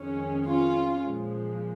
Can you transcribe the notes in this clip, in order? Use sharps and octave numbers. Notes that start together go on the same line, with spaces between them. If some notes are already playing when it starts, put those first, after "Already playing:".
Already playing: F2 D#3 G#3 C#4
C#4 F4
A#2 F3 G#3